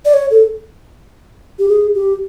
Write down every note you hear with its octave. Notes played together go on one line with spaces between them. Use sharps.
D5
C#5
A4
G4
G#4
G4